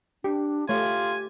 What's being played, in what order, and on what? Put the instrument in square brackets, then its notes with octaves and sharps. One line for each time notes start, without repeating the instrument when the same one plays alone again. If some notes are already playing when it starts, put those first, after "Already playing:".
[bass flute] D4 [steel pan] G4
[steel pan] A3 C#5 [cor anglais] F4 [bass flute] G4 [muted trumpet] G#5